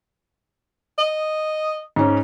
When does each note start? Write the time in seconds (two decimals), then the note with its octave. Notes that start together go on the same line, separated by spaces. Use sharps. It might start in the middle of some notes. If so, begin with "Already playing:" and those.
0.98 D#5
1.96 G#2 C#4